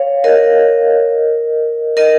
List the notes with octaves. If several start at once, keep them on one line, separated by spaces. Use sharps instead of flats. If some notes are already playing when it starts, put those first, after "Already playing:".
Already playing: C#5 F5
A#4 D#5
A#4 D#5